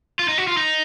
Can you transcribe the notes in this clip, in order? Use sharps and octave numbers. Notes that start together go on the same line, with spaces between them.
F4
D#4
F#4
F4
D#4